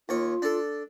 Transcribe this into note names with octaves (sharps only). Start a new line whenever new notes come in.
D#2 F4 C#5
D4 A4